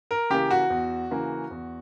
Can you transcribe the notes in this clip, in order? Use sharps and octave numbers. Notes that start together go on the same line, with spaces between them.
A#4
C#3 E3 A#3 G4
F#4
E2
C#3 E3 A#3
E2